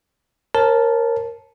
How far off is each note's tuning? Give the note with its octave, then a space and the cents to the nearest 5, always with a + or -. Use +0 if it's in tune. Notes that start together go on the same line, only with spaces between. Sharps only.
A#4 +0 C#5 -40 A5 -10